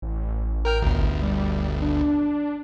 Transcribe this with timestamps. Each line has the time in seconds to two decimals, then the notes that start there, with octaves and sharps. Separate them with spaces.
0.02 A1
0.65 A#4 G5 F6
0.82 G1 D2
1.22 G3
1.82 D4